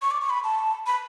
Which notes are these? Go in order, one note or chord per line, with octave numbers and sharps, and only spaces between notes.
C#6
D6
C#6
B5
A5
B5